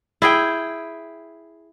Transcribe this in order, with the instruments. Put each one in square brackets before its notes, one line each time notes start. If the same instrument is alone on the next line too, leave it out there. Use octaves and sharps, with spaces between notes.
[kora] E4 G#4 G5